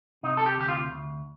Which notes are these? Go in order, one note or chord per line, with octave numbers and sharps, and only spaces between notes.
C3 D#4
A4
G4
D2 G4
F4
D2